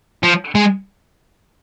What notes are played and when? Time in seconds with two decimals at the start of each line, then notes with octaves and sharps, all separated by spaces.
0.23 F3
0.55 G#3